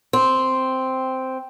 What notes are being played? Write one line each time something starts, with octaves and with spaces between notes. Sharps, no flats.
C4